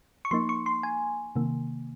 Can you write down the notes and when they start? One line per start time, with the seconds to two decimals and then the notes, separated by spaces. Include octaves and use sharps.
0.25 C#6
0.31 F3 A#3 D#4 C6
0.49 C#6
0.66 C6
0.83 G#5
1.36 C3 D#3 A#3